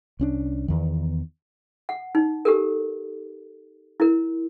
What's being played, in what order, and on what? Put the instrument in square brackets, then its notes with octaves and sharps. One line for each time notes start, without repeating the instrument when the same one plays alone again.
[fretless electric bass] C2 C#4 D4
E2 D#3
[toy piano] F#5
D#4
G4 A4 A#4
E4 A#4